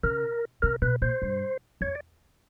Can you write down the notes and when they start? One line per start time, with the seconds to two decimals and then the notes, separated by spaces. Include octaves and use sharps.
0.03 C#3 A#4
0.62 C3 A#4
0.82 B2 B4
1.02 A#2 C5
1.22 G2
1.81 F2 C#5
1.95 D5